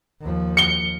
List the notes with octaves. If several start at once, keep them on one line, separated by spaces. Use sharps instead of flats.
D#2 F3
C#7 G7